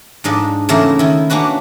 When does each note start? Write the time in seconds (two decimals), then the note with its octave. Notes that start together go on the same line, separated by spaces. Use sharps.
0.24 G#2 F3 D4 D#5
0.69 E2 C#3 A3 A#3 E4 A#4
0.99 D#3 E4
1.30 A#3 C#4 D4 F#4 B4